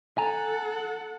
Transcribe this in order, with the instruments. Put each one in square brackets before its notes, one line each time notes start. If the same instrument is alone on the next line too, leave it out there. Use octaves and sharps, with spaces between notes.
[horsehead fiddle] A4 F#5 [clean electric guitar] G#5 A#5